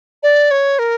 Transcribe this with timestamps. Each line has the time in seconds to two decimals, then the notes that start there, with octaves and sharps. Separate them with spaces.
0.23 D5
0.51 C#5
0.79 A#4